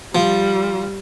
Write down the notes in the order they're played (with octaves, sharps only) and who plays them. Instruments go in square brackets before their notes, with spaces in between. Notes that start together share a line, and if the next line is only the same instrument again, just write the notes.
[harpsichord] F3 [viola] G3